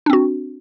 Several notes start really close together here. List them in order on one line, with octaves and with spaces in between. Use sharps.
D4 C4 F#4